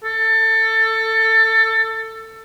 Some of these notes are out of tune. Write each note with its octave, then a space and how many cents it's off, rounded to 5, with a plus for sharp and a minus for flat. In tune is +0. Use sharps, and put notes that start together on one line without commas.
A4 +20